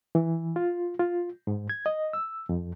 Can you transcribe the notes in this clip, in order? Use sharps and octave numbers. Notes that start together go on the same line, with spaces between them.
E3
F4
F4
G#2
G#6
D#5
E6
F2